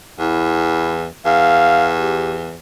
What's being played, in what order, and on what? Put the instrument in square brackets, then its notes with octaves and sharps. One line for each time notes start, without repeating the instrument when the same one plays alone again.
[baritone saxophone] E2 [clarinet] E4
[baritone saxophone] E2 [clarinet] F5
[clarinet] G4